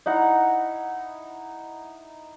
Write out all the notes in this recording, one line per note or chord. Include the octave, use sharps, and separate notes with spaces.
D#4 E4 F#5 A#5